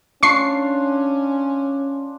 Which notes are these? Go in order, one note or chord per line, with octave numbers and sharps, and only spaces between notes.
C#4 D4 F4 C#6 C7